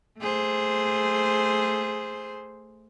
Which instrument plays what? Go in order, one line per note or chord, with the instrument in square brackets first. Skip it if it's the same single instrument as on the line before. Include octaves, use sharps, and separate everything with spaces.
[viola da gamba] A3 G#4 C5